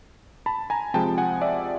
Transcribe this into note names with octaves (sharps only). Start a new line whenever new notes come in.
A5 B5
G#5 A#5
C3 F3 G#3 G5 A5
F#5 G#5
D5 E5